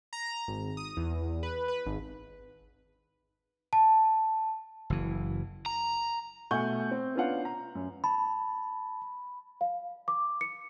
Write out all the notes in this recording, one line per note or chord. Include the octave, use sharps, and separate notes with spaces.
A#5
G#1
D#6
E2
B4
B4
G#1
A5
F#1 E3
A#5
B2 A3 F#5 G#5 C#6 G6
C4
B3 C#4 D4 F4 F5 F#5
A#5
F#2
A5 B5
F5
D6
C#7